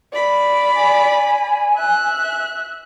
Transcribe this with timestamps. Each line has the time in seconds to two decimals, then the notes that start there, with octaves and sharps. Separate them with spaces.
0.13 D5 B5
0.75 G#5
1.76 E5 F#6